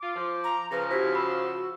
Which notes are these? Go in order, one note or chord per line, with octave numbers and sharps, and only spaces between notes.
F4 D6
F3
A#5
C#3 F3 B4 A#5
E4 F#4 G4 C5
B5 E6